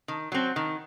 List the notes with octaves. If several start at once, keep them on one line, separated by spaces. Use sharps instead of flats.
D#3
F#3 C4
D#3